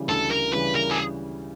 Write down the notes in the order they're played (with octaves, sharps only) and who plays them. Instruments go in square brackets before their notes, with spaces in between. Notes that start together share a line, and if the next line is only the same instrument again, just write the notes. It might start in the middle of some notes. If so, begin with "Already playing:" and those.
Already playing: [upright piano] C#3 E3 G3
[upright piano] D2 [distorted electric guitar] A4
[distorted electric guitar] A#4
[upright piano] C#3 E3 G3 [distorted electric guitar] B4
[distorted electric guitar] A#4
G#4